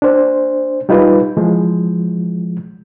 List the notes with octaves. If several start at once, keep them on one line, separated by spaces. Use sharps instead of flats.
D4 C5
G3 D#4 F4 B4
E3 F3 G#3